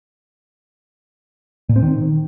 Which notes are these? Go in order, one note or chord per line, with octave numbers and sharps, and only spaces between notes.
A#2
C4
D#3